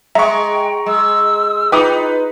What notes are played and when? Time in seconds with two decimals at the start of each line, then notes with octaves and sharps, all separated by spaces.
0.15 G#3 E5 G5 A#5 C#6
0.86 G#3 E6
1.72 D#4 F4 B4 G5 D6 D#6